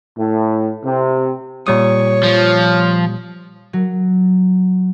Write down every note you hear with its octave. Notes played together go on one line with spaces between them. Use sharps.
A2
C3
A#2 G3 C#5 D#6
F3
F#3